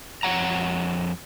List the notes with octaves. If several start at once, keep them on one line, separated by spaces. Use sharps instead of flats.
F2 D#3 C#5 F#5 A#5